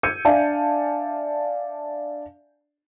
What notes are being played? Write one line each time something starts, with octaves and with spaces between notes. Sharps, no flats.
E6 G6 G#6 C#7 D#7
D4 D5 E5 F5 G#5 A5